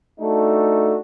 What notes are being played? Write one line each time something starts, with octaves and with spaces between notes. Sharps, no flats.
A3 D4 D#4 F#4 A4